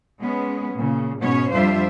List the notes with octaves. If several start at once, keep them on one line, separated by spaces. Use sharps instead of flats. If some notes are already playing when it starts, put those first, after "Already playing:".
G#3 B3 C#4
A#2 C#3
G#2 B2 B3 C#4 C#5
F2 G3 D4 F4 C5 E5